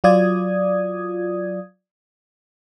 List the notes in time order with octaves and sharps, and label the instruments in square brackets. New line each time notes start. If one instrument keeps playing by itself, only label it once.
[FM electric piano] F#3 F4 D5 D#6 G#6